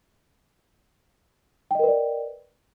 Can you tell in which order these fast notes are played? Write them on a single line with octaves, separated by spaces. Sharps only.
G5 D#5 A#4 B4 D5